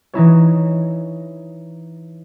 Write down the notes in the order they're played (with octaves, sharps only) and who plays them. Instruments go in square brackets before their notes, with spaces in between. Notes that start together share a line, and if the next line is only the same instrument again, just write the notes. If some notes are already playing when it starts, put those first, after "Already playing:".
[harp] E3 D#4 E4 C#5